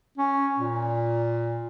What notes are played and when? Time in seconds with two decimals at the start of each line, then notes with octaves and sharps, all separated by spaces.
0.18 C#4
0.59 A#2